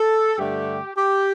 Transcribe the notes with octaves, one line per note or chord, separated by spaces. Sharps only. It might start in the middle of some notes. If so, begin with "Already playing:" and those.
Already playing: A4
G2 D3 A3 G4
G4